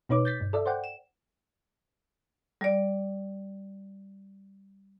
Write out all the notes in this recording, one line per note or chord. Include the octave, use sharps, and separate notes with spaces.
B2 D#4 B4 C#5 D6
G6 A6 B6
G2
A4 D5 E5
C5 D5 F#5 G5
E7
G3 D5